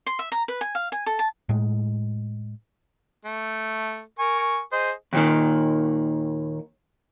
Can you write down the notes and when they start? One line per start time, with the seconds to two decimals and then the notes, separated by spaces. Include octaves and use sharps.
0.06 C6
0.19 E5
0.32 A#5
0.48 B4
0.61 G#5
0.75 F5
0.92 G#5
1.06 A4
1.19 A5
1.49 A2 G#3
3.25 A3
4.19 A#4 G#5 C#6
4.72 G#4 C5 D#5
5.13 D#2 A#2 D#3